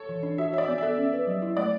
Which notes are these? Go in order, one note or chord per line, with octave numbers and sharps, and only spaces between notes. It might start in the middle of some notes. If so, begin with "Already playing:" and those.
Already playing: A4 C#5
E3
D4
F#4 E5
C#5 E5
D5
B3
A4 E5
C#4
B4
F#3
E4
A3 D5